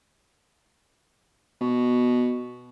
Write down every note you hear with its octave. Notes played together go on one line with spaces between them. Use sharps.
B2